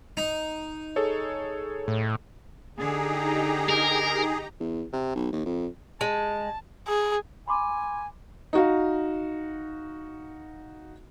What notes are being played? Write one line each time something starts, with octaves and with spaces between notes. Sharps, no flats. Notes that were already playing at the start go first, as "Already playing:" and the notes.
D#4
G#4 A4 C#5
A2
D3 D#4 G4 G#4 A#5
A#4
E2
C3
B1
D#2
F2
G#3 A5
G#4
G#5 B5 C6 D6
D#4 F#4 F5